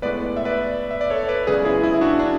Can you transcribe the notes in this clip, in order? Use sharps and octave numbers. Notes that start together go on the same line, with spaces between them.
A2 G#3 B3 B4 D5
D5
E5
B4 D5
E5
D5
A4 C#5
B4 D5
F#2 C#3 G#3 B3 G#4 B4
E4 G#4
E4
E4
D4 F#4
D4